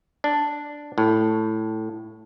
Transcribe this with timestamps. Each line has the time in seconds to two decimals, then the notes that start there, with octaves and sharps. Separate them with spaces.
0.24 D4
0.98 A2